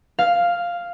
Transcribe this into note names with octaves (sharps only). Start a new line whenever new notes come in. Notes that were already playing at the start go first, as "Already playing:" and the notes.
F5